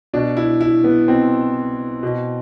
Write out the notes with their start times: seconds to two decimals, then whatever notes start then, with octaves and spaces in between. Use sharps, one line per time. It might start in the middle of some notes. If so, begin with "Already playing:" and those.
0.13 B2 D4
0.37 E4
0.61 E4
0.84 B3
1.08 B2 C4
2.03 B2